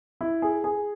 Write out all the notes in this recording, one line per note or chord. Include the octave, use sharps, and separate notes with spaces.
E4
G#4
G#4